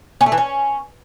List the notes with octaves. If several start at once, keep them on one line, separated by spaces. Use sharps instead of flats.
C#4
A3
E3
C#4